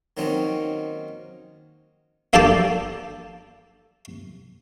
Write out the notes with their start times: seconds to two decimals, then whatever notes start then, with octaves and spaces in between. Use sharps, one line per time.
0.17 D#3 F#3 A#3 C4 C#4 D#4
2.33 A#3 D4 A4 G5 A5 D6